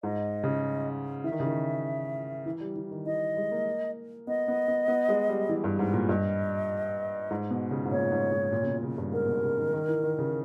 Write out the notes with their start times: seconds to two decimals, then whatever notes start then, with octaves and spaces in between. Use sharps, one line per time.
0.03 G#2 D#5
0.44 C#3
1.24 E3 E5
1.32 D#3
1.40 C#3
1.47 D#3
2.46 E3
2.60 G3
2.76 E3
2.91 D#3
3.06 E3 D#5
3.37 G#3
3.52 A#3
4.27 B3 D#5
4.48 B3
4.68 B3
4.88 B3
5.09 G#3
5.29 G3
5.49 E3
5.64 G2
5.79 G#2
5.94 A#2
6.09 G2 D#5
7.31 G#2
7.51 B2
7.71 C#3
7.85 G#2
7.91 A#2 C#5
8.12 G#2
8.32 G#2
8.52 A#2
8.62 C#3
8.67 B2
8.83 C#3
8.98 G2
9.12 G#2 A#4
9.27 B2
9.43 C#3
9.58 D#3
9.73 D#3
9.88 E3
10.03 D#3
10.18 C#3